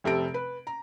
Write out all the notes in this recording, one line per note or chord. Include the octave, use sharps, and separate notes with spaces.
F1 C3 A4 D7
B4
A#5